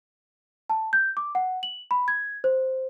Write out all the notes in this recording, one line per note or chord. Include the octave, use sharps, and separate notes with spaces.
A5
G6
D6
F#5
F#7
B5
G#6
C5